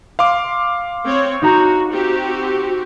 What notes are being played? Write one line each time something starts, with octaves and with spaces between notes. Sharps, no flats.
F5 C6 D6
C4 C#5
D#4 F#4 A#5 G6
C4 F#4 G4